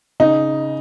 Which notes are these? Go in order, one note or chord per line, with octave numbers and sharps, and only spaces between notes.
C#3 D#4